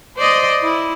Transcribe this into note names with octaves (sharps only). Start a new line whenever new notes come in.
C5 D5 D#5
E4